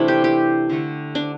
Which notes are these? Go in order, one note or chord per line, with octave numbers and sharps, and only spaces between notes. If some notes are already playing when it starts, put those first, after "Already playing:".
Already playing: C3 E3 A3 D4 E4
G4
G4
D3 A3
D4